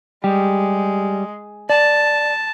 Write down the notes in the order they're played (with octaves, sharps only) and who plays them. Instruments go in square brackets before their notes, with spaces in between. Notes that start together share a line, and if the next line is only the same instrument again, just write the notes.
[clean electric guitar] G3 G4 [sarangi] G#3
[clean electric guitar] D5 [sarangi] A5